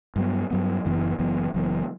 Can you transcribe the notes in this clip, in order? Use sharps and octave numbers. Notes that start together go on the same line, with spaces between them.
G2 F#3 B3
G2 F#3 B3
F#1 F#2 E3 B3
F#1 F#2 E3 B3
F#1 F#2 E3 B3